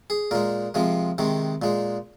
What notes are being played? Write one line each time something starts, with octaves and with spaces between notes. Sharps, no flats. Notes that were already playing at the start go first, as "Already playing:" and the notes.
G#4
A#2 G#3 A#4
C3 F3 G#3
C3 D#3 G#3
A#2 G#3